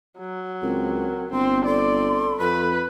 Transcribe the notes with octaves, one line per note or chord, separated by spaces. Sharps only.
F#3
C#2 C4 A#4
G1 C4 C6
A4 D5 C6
F2 B4 B5